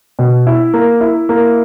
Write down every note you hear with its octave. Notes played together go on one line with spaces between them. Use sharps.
B2
E4
A#3
E4
A#3